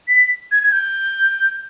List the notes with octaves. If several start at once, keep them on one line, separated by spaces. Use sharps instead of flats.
B6
G#6
G#6
G6